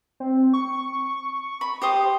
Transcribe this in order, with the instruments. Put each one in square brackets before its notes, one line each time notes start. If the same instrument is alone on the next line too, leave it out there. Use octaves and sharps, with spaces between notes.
[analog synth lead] C4
C#6
[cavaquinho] B5
G4 C5 D#6